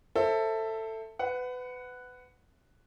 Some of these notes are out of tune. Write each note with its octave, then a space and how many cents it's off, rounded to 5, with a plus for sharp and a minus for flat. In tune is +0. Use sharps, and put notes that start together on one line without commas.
A4 +15 C5 +20 E5 +0
B4 +25 F#5 +0